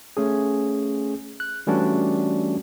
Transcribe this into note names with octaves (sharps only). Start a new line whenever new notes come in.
A3 C#4 G#4
F#6
E3 G3 A3 C#4 D4 F#4